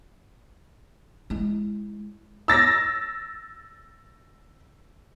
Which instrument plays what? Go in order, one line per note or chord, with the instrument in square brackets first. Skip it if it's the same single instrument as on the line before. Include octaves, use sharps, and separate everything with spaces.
[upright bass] G#3 E4
[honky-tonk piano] E6 A6 A#6